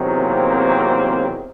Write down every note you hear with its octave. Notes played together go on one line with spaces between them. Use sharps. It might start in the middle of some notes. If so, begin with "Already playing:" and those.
Already playing: E2 C3 D#3 F#3
A#3 C4